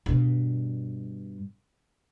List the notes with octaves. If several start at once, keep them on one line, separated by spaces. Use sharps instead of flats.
G2 B2